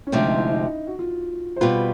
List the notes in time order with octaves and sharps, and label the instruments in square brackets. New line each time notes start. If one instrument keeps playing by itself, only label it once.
[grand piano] C#4
[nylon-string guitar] D2 C3 F3 G#3 C4 [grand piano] D4
[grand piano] D#4
E4
D#4
F#4
F4
C5
[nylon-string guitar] B2 G3 C4 F4 [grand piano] B4